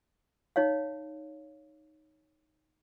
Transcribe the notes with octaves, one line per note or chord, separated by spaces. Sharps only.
D#4 C#5 F5